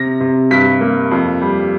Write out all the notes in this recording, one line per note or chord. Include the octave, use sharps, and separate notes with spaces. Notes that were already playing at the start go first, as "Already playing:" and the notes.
Already playing: C3 A#6
C3
G2 B6
A#3
F2
G3